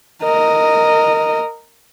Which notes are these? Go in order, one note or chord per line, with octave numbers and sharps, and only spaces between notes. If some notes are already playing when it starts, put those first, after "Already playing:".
A#4 D#5